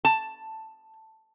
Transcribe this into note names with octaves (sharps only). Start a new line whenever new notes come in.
A5